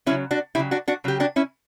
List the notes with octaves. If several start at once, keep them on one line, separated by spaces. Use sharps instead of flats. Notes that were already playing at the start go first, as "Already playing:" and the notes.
C#3 F#3 C#4 E4
D4 F#4
C#3 F#3 E4 G4
D4 F#4
D4 F#4
C#3 F#3 G4
D4 F#4
C#4 E4